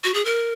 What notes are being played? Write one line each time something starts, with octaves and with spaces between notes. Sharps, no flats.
F#4
G#4
A#4